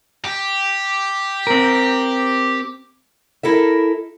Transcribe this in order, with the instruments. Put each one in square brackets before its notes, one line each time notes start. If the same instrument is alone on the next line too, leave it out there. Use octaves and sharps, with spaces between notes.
[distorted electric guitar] G4
[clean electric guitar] C4 A#4
[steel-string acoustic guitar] E4 A4 A#4 E5